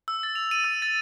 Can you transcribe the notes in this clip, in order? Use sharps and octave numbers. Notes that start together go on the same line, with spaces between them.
E6
A6
F7
D#7
E6
A6